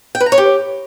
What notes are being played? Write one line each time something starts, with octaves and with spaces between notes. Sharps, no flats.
G5
B4
A#5
C#5
G4